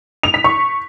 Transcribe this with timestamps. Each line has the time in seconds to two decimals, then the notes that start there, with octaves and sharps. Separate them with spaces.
0.23 F7
0.34 B6
0.44 C#6